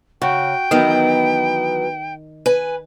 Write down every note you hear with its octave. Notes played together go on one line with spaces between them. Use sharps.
C#3 F#4 G5
D#3 E3 F#3 B3
B4 G#5